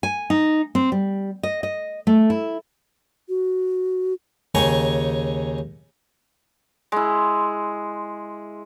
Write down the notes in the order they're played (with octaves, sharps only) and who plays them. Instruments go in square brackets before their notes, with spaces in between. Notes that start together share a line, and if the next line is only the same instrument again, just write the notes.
[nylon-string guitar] G#5
D#4
C4
G3
D#5
D#5
A3
E4
[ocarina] F#4
[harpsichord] D#2 C#3 G5 G#5 A#5 C#6
[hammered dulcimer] G#3 E4